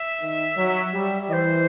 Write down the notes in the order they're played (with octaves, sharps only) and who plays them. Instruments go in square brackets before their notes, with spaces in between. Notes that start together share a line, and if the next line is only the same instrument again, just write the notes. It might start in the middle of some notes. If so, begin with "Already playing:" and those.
Already playing: [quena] E5
[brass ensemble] D#3
F#3
G3
[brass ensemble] E3 [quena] C5 D#5